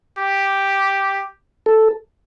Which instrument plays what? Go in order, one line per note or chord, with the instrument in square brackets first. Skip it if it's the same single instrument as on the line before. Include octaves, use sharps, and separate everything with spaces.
[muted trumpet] G4
[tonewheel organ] A4